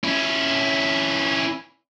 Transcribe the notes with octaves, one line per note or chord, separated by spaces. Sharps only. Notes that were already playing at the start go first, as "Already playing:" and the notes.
C#4 E4